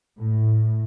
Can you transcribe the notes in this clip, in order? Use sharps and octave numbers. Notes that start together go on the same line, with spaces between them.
A2